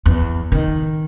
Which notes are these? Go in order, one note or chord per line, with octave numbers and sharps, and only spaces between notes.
E2
D#3